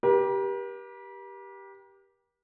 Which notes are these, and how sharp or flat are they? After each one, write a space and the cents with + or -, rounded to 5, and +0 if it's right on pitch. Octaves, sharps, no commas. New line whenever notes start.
G4 +0 A#4 +45